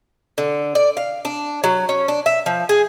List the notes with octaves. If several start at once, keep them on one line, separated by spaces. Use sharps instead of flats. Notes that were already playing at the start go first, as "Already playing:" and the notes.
D3
D5
F5
D4
F#3
C#4
D4
E5
F3
G#4